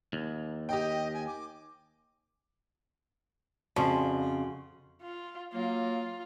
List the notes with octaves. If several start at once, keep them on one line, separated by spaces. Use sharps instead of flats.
D#2
G4 D#5 G5
G#5
D6
F2 C#3 F3 G3 F#4 C6 C#6
F4
F#3 A#3 F4